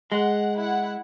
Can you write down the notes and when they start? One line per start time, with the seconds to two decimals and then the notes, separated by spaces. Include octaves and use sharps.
0.12 G#3 F#5
0.58 E4 F#5